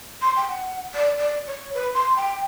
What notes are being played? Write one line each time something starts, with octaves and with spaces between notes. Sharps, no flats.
C6
G5
F#5
D5
D5
C#5
B4
C6
G5